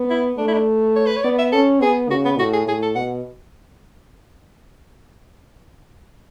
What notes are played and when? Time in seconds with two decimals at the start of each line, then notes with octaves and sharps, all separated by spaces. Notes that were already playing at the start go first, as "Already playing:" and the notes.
Already playing: B3
0.10 E4
0.38 A3 D4
0.48 E4
0.53 D4
0.96 C#5
1.06 B4
1.16 C#5
1.24 B3 D5
1.39 E5
1.53 C#4 A4
1.81 B3 G#4
2.10 C#3 F#4
2.25 B3
2.38 A2 F#4
2.53 G#4
2.67 A2 G#4
2.82 A4
2.96 B2 F#5